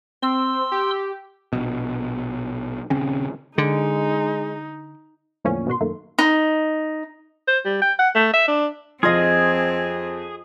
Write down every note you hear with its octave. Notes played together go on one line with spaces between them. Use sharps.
C4 C6 E6
G4
A#1 B2
D#1 C#3 C4 C#4
D3 G#3 D#4
E2 A2 D3 F3 A#3 C#4
G#1 B2 F#4 C6
F#2 D#3 A3 A#3
D#4
C5
G3
G5
F#5
A3
E5
D4
F2 C4 F4 G#4 D#5